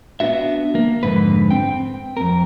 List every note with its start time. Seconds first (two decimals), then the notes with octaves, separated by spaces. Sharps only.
0.20 B3 D4 F#4 E5
0.75 A#3
1.03 F2 G#2 D3 B4
1.50 C4 G5
2.17 F2 A#4